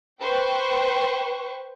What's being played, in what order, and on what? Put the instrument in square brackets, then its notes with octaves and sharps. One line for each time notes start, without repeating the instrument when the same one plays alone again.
[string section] B4 C5 G5 C#6